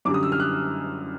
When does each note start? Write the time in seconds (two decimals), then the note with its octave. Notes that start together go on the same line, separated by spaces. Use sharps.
0.05 F#2 D3 G3 D6
0.14 D#6
0.23 E6
0.32 F6
0.40 F#6